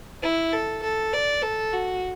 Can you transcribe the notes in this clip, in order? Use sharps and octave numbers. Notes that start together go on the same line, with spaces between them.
E4
A4
A4
D5
A4
F#4